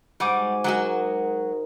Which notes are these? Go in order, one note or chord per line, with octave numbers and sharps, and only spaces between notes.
G#2 G3 F#4 F#5 G#5 D6
F#3 G#3 F#4 A#4 D#5